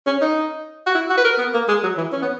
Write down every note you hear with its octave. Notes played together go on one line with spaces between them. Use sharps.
C#4
D#4
F#4
E4
F#4
B4
A#4
B3
A#3
G#3
F#3
E3
C#4
B3